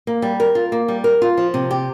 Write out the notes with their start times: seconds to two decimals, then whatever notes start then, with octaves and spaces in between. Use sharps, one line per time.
0.07 A#3
0.22 G3
0.40 A#4
0.55 F4
0.72 A#3
0.88 G3
1.04 A#4
1.22 F4
1.37 F3
1.54 C3
1.71 G4